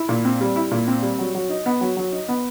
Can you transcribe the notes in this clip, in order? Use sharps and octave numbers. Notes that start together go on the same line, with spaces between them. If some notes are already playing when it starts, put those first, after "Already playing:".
Already playing: E4
A#2
C4
G3
E4
A#2
C4
G3
F#3
F#3
D#4
B3
F#3
F#3
D#4
B3